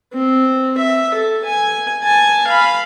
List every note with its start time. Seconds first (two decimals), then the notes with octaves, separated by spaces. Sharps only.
0.13 C4
0.78 E5
1.14 A4
1.45 G#5
2.03 G#5 A5
2.47 F5 B5